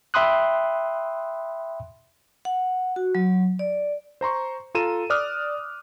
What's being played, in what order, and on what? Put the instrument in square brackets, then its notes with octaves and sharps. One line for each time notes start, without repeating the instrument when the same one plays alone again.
[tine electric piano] E5 G5 B5 C6 D#6 F#6
[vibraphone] F#5
F#4
F#3
D5
[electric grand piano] C5 A#5 C6 C#6
F4 A4 A#5 D#7 E7
D5 D6 D#6 F6 F#6